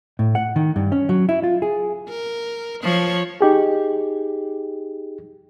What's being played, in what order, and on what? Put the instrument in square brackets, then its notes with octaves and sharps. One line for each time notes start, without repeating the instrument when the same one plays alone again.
[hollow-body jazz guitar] A2
F#5
D#3
G2
C#4
F#3
E4
F4
G#4
[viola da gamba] A#4
F3 C#5
[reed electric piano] D#4 G4 G#4